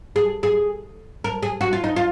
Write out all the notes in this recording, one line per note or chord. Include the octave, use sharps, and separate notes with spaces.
G#4
G#4
A#4
G#4
F#4
F4
D#4
F4